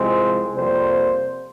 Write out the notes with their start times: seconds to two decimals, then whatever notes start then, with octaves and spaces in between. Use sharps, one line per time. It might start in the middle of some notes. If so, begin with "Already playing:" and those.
Already playing: C2 C3 F3 G#3 C4
0.54 F2 C3 G3 A#3 C5